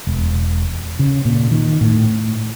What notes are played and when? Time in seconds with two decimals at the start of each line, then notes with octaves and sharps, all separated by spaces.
0.07 E1
0.99 C#3
1.25 A#2
1.51 D#3
1.81 A2